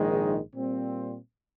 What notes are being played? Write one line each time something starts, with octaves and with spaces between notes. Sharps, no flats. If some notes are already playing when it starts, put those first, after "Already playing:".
Already playing: A#1 G#2 D#3 G#3
A#2 G3 C4